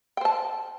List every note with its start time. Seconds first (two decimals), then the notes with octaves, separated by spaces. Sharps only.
0.17 G5
0.21 C5
0.25 A5